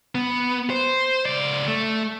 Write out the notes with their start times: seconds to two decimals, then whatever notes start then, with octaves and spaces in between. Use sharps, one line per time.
0.15 B3
0.70 C5
1.26 C#2 D5
1.68 A3